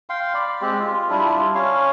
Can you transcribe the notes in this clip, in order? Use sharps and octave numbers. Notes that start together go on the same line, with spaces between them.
F5 G5 C6
D5 B5
G#3 C4 G4
F4
G3 D4 E4 F4
C#4 C#5 F5